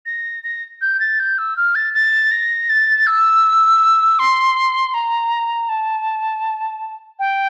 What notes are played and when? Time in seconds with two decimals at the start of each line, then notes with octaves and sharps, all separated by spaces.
0.06 A#6
0.44 A#6
0.81 G6
1.00 A6
1.19 G6
1.38 E6
1.57 F6
1.75 A6
1.94 A6
2.31 A#6
2.69 A6
3.07 E6
4.19 C6
4.94 A#5
5.69 A5
7.19 G5